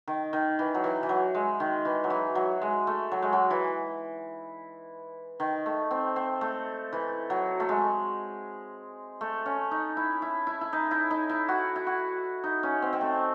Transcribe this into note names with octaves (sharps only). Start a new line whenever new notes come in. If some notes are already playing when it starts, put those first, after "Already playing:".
D#3
D#3
E3
F#3
E3
E3
F#3
G#3
D#3
E3
F#3
E3
F#3
G#3
A3
F#3
G#3
F#3
E3
D#3
A3
C4
C4
A3
E3
F#3
A3
G#3
A3
C#4
D#4
E4
E4
E4
E4
D#4
E4
D#4
E4
F#4
E4
F#4
D#4
C#4
C4
C4
A3